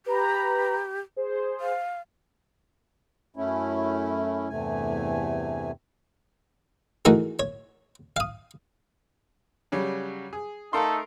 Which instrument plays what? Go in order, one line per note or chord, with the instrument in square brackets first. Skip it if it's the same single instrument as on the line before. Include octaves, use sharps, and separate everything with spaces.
[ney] G4 [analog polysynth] B4 A#5 B5
[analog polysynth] G#4 C5
[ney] F5
[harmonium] F#2 A3 C#4 E4
E2 G2 C3 A3 G#5
[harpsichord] E3 A3 D#4 F#4 G#4 A#4
C#5
F5 D#6
[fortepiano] C#3 F#3 G3
G#4
[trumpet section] A3 D#4 A4 [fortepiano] A#4 F5 C6